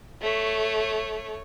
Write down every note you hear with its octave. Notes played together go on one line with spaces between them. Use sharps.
A3 C#5